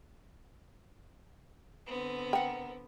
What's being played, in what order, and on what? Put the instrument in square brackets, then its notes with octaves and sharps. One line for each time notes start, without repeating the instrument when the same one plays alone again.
[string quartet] D3 B3 C4
[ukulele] A#4 F#5 [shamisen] G5